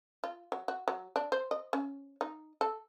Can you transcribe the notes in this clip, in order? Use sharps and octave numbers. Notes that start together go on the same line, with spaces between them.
F4
F#3
F#4
F#3
D4
C5
D#5
C#4
D#4
A4